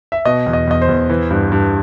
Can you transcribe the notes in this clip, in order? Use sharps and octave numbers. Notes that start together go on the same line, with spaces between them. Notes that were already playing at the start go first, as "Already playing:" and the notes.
E5
B2 D#5
E2
D#5
E2 D#5
C5
E2
E3
G2
G2